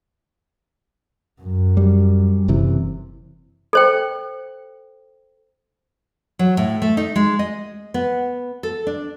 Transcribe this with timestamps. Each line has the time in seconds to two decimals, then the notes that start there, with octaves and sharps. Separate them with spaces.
1.42 F#2
1.77 G3
2.48 F#1 C3 E3
3.73 A4 C5 G5
6.39 F#3
6.57 A2
6.82 A3
6.97 D#4
7.16 G#3
7.39 D#5
7.94 B3
8.63 A4
8.87 D4